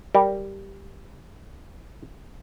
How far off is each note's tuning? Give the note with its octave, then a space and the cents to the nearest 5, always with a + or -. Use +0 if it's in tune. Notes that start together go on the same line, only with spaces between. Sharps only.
G3 +0 A#4 +0